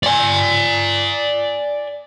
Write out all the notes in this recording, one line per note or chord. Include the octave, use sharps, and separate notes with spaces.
D5 G#5